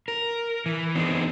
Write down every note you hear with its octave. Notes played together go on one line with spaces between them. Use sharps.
A#4
E3
B3 C4 D4 D#4 G#4